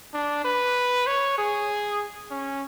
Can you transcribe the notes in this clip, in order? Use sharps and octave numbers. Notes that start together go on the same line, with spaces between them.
D4
B4
C#5
G#4
C#4